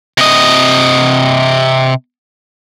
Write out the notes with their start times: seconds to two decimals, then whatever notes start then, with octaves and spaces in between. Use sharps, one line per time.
0.18 C3 D#5